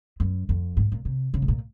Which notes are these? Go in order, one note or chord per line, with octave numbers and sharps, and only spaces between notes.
F#2
F2
G#2
A#2
C3
C#3
G#2
A#2